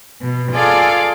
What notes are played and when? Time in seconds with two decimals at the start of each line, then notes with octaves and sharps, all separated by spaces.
0.21 B2
0.53 F4 G#4 A4 D5 F5 D6